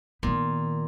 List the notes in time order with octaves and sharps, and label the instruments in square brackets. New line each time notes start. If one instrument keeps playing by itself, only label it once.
[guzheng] A#2 [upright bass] D#3 B3